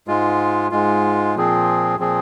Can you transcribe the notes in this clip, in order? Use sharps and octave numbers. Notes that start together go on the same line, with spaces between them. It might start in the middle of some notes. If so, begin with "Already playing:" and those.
G#2 G#3 F4
G#2 G#3 F4
A#2 F3 C4 G#4
A#2 F3 C4 G#4